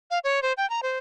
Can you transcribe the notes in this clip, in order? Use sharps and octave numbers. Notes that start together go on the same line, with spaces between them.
F5
C#5
C5
G5
A#5
C5